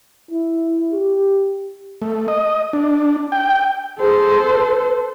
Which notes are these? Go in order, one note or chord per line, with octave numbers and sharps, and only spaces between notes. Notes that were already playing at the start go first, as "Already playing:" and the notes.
E4
G4
A3
D#5
D4
G5
G#4 A4 C5
B4